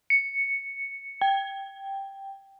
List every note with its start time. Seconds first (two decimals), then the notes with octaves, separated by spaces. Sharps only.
0.10 C#7
1.21 G5